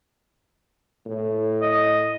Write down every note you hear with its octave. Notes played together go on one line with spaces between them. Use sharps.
A2
D#5